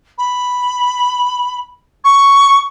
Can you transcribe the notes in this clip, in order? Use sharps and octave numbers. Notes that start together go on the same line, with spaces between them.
B5
C#6